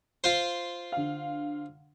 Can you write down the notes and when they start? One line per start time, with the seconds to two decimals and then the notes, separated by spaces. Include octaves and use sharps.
0.24 F4 C5
0.92 D3 F5